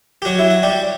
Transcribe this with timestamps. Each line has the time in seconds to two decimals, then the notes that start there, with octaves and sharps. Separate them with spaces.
0.22 G4
0.25 F#3 F#4
0.39 E4
0.50 F#4
0.63 G3 G4